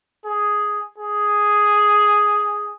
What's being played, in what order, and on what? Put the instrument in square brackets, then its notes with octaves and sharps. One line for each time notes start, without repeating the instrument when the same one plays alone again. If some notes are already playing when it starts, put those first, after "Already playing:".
[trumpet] G#4
G#4